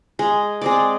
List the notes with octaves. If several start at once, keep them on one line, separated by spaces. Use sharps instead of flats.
G#3
G#3 C4 D5